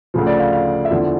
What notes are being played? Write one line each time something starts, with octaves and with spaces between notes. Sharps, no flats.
D2 C#3 F3
D5
F5
F5
E5
E2 D3 F3 D5